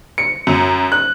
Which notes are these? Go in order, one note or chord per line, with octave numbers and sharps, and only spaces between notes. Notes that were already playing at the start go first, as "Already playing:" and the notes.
C#7
F#2
F#6